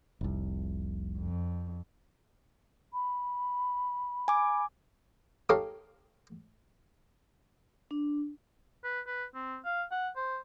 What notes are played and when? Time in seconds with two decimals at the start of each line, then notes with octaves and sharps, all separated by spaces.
0.21 F1 C2
1.18 F2
2.92 B5
4.28 G#5 D6
5.49 D#4 G4 A4 C#5 F5
7.91 D4
8.84 B4
9.07 B4
9.35 C4
9.65 F5
9.91 F#5
10.16 C5